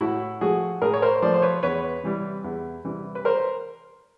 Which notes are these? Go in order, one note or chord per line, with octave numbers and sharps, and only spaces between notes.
A2 E4 F#4
F3 A3 F#4 G#4
A2 G#4 A#4
C#5
A#4 C5
F3 A3 C5 D5
C5
B4 C#5
E2 B4 C#5
C3 E3 G3
E2
C3 E3 G3
B4
A#4 C5